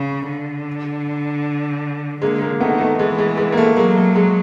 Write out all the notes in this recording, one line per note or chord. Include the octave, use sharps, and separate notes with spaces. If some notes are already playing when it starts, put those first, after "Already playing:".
Already playing: C#3
D3
D3 G#3 A#3
G#3 A#3
D#3 A3 B3
A3
E3 G#3
G#3
G#3
A#3
A3
F#3 G#3 A#3
A3
G#3